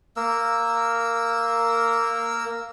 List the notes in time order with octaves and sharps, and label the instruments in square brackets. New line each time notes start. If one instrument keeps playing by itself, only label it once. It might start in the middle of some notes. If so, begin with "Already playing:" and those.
[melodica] A#3 A#4 E6